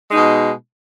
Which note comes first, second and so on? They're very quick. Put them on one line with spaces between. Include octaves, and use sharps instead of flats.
G#3 D#4 B2